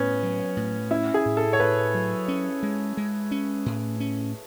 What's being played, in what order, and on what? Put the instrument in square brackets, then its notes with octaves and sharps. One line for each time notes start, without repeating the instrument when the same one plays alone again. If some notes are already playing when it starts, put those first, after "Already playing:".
Already playing: [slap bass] A2 [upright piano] B3 C#4
[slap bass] F#3
A2
[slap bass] C#4 [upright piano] E4
[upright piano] G#4
[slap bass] A2
[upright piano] A4
C#5
[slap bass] A2 [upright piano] B4
[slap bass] F#3
C#4
G#3
G#3
C#4
A2
C#4